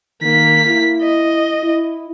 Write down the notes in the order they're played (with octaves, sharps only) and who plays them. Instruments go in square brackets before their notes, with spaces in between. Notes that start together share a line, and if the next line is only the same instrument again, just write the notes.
[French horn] D#3 [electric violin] A#3 B6
[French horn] E4
[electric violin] D#5
[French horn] E4